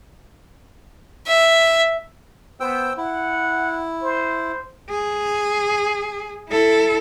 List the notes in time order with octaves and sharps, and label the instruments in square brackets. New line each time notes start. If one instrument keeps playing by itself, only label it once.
[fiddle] E5
[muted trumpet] B3 [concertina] C5 G5 E6
[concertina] E4 [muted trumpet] F#5
[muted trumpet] C5
[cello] G#4
E4 A4